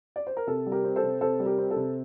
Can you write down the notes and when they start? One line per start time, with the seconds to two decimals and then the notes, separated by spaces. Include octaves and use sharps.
0.16 D5
0.27 C5
0.37 A#4
0.47 C3 A4
0.66 G3
0.72 G4 A#4
0.84 C4
0.96 A4 C5
1.03 C3
1.21 C3 A4 C5
1.40 G3
1.46 G4 A#4
1.58 C4
1.71 A4
1.76 C3